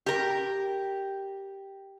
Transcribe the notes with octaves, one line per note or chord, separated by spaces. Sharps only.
G4 A#4